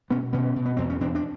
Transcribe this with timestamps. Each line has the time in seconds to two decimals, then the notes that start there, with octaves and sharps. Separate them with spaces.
0.10 B2 B3 C#4
0.33 B2 B3 C#4
0.56 B2
0.66 B3
0.77 E2 C4
0.90 C#4
1.01 E2 C4 D4
1.15 D4